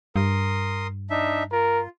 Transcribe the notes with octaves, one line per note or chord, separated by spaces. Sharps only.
G2 A#4 C6 D#6
D4 D#4 E5
F4 A#4